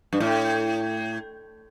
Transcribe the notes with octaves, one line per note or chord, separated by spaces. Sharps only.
G2
A2